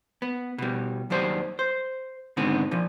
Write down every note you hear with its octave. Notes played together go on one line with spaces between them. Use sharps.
B3
B2 G3
D#2 F#3 G3 C5
C5
G#2 D3 D#3 B3 C4
A#2 F3